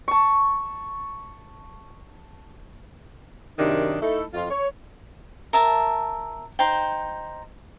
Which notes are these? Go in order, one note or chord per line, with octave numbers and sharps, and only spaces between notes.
A5 C#6
F#2 C3 D#3 D4 D#4
A3 D#4 E4 A4
F2 F4
C#5
A#4 E5 A5
D#4 C5 G5